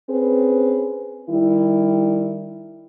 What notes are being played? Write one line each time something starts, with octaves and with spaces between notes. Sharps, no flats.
C4 C#4 G#4 B4
D#3 G3 E4